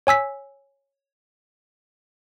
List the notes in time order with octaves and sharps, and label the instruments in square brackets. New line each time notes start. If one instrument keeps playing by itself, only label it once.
[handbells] C#5 G#5 E6 B6